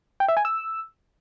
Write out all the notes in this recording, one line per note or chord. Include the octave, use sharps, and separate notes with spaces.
G5
E5
G#5
E6